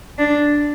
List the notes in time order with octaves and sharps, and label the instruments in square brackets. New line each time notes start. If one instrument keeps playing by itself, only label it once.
[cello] D4